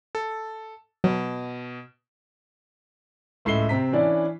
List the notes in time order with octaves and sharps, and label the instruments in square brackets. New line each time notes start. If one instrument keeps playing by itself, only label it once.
[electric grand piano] A4
[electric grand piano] B2 [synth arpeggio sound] F#3
[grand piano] C#2 A2 E5 C7 G7
C3 C4 A#5 B6
E3 C#4 D4 E4 D5